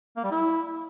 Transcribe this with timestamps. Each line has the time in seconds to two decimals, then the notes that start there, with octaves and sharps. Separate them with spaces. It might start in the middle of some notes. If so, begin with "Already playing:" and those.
0.17 A#3
0.24 G3
0.31 E4